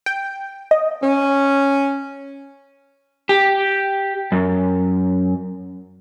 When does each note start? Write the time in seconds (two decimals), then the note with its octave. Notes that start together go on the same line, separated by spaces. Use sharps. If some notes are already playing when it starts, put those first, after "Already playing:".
0.06 G5
0.71 D#5
1.03 C#4
3.29 G4
4.32 F#2